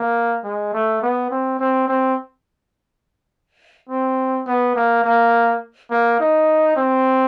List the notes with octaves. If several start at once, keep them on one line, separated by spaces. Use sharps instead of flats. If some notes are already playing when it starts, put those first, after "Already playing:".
Already playing: A#3
G#3
A3
B3
C4
C4
C4
C4
B3
A#3
A#3
A#3
D#4
C4